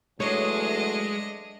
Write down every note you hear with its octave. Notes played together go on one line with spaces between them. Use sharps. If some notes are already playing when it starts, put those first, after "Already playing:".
E2 F#3 G#3 A3 D4 C#5 D#5